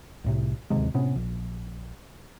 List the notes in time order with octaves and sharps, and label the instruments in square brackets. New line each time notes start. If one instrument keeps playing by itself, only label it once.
[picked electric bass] C2 A2 C3
D1 D#2 C3 G#3
A2 C3 B3 C#4
A#1